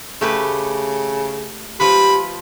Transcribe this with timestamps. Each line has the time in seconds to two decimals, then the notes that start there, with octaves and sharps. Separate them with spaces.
0.21 C#3 A3 G4 B4
1.80 F3 G4 B4 B5